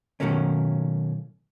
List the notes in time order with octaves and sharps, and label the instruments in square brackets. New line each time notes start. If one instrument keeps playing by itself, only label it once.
[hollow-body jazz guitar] B2 D#3 F#3 A3 A#3 C#4